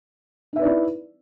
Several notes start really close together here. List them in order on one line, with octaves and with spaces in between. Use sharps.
D#4 E5 B4 D5 E4